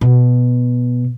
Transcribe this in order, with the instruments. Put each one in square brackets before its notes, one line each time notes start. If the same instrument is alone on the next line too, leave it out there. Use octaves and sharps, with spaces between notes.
[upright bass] B2